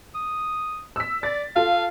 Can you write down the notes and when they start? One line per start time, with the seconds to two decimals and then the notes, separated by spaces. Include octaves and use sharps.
0.15 D#6
0.96 E6 B6
1.23 D5 A6
1.56 F4 A4 F5